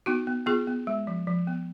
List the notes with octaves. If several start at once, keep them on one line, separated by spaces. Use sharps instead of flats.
B3 D#4 F#4
B3
B3 F4 G#4
B3
G#3
F3
F3
B3